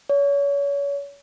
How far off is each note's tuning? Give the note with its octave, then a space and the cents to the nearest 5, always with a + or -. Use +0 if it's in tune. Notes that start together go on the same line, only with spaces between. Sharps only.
C#5 +30